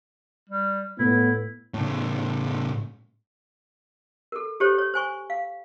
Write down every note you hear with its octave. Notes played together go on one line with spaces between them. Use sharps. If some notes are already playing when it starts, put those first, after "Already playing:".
G3
A2 B3 E4
A2 C#3
A4 A#4
G4 A4 C5 C#5
C#5
C5 G#5 C#6
F5